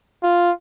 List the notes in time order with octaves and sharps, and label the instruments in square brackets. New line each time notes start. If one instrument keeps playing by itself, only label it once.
[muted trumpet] F4